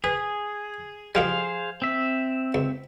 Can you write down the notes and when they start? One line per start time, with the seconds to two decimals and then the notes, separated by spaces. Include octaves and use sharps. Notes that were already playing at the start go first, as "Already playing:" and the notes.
0.04 G#4 B4
1.15 F2 F3 G3 G#4 C5 F5
1.82 C4 E5
2.54 C#2